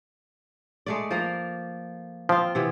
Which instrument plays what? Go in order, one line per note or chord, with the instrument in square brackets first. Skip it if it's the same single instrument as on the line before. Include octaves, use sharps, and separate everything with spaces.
[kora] G#3 A3 D5
F3 A#3 A#4
[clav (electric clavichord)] F3 [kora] C4 F4
[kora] C3 E3 B3